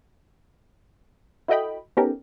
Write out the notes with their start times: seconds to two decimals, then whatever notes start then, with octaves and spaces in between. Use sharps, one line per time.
1.48 E4 F#4 A4 D#5 G5 B5
1.97 B3 C#4 D#4 G4 A4 A#4